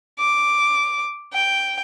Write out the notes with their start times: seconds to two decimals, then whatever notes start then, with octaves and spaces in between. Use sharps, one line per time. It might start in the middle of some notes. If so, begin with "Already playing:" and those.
0.19 D6
1.33 G5